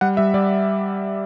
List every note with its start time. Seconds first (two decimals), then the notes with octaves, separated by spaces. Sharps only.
0.01 G3 F#5
0.17 G3 E5
0.34 G3 D5